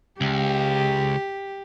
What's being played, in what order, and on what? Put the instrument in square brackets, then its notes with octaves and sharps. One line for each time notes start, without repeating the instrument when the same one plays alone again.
[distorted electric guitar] C#2 [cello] G4